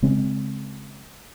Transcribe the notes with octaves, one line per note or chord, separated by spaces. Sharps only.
C#3 G#3 C4 C#4